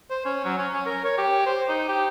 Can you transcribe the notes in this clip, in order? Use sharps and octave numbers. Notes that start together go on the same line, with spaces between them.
C5
C#4
F#3
C#4
C#4
A#4
C#5
G4
C5
D#4
G4